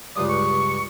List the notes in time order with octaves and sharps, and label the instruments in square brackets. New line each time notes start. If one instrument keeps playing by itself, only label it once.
[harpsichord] C#2 G2 D5 [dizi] D#6
[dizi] C#6